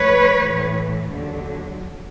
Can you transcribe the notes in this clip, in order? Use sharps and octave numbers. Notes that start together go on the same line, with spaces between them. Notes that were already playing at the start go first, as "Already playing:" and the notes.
Already playing: A2 F3 B4 C#5
A2 E3
D#2 D3 F#3